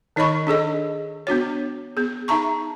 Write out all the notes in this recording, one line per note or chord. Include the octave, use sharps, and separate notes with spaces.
D#3 D#4 C#5 D#5 B5 C#6
D4 G#4 A4 D#5
B3 D4 F#4 C#5
B3 G#4
D#4 E5 A5 A#5 C#6